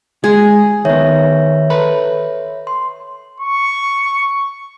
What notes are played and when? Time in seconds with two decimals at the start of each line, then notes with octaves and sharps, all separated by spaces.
0.24 G#3 G#4
0.85 D#3 B3 C#5 E5
1.70 A4 B4 B5
2.67 C6
3.40 C#6